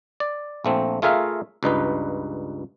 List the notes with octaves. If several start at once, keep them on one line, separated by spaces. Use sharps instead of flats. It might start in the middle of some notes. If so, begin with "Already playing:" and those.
D5
A#1 A3 C4
A3 F4 G#4 A#4 E5 F5
C#2 G2 D#4 B4